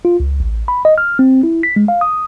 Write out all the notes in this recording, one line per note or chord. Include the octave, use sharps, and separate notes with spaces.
F4
C#2
A1
B5
D#5
F6
C4
E4
B6
G#3
F5
D#6